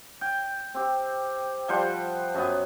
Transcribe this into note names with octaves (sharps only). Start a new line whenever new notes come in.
G5
C4 G4
F3 G3 C5 F#5
F#2 B3